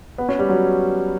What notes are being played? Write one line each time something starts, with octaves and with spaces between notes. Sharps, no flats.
B3
C#4
G3
F#3